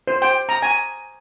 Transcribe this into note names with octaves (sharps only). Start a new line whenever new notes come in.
C5
G5
A#5
G#5